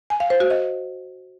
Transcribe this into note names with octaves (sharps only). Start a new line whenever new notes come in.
G#5
F5
C5
F#4
D#5